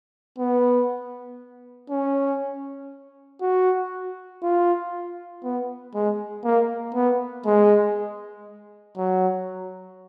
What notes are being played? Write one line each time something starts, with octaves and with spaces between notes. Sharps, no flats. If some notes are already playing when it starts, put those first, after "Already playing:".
B3
C#4
F#4
F4
B3
G#3
A#3
B3
G#3
F#3